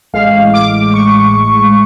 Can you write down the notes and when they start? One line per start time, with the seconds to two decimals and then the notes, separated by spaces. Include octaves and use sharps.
0.13 A1 A2 G#3 F5
0.54 D6
0.94 C#6